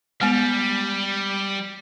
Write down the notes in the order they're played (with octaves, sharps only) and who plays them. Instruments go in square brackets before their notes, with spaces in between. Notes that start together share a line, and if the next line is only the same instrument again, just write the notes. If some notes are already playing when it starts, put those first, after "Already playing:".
[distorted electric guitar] G3 [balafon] G#3 B3